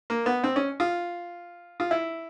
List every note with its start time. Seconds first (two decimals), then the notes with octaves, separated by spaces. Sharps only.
0.10 A#3
0.26 B3
0.44 C4
0.56 C#4
0.80 F4
1.80 F4
1.91 E4